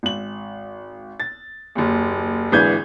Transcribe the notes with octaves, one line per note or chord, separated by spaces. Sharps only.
G#1 F#7
A6
F#1 D#2
G#1 D3 E3 G#4 G6 G#6